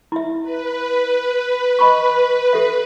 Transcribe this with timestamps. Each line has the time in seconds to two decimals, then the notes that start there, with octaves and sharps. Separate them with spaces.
0.12 E4 E5
0.42 B4
1.79 D#5 B5 C#6
2.53 G4 A4 E5